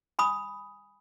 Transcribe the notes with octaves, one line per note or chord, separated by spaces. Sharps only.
G#5 B5 D#6